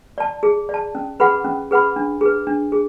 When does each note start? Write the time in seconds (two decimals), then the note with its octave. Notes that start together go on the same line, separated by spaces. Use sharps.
0.18 D5 A5
0.43 G#4
0.69 D5 A5
0.95 C#4
1.20 G#4 B4 F#5 B5
1.45 C#4
1.71 G#4 B4 F#5 B5
1.96 D4
2.21 G#4 B4
2.47 D4
2.72 G#4